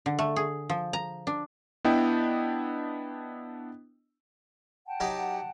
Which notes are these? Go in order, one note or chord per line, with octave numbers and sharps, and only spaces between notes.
D3
A3
G#4
F3
A#5
D4
B3 D4 E4 D#5 G5
F#5 G5 A5
F#3 D#4 G4